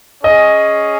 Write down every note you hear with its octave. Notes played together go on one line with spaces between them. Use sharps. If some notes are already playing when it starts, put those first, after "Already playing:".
C#4 G#4 C#5 D#5